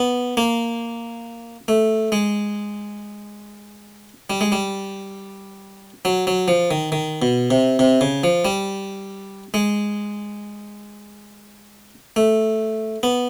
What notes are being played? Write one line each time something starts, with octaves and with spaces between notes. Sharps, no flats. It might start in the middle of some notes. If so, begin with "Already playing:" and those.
Already playing: B3
A#3
A3
G#3
G3
G#3
G3
F#3
F#3
F3
D#3
D#3
B2
C3
C3
C#3
F3
G3
G#3
A3
B3